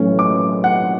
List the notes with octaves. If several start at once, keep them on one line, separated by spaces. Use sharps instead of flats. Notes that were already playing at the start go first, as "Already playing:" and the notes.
Already playing: B1 A2 E3 A3 C#4
D6
F#5